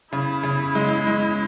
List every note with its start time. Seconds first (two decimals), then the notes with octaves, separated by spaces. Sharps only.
0.12 C#3 E4
0.43 C#3
0.75 G#3
1.07 G#3